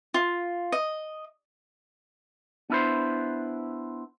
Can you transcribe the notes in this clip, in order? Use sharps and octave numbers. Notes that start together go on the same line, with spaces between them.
F4
D#5
B3 D4 E4 B4 C5